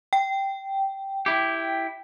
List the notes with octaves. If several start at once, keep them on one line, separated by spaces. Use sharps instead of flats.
G5
E4 G4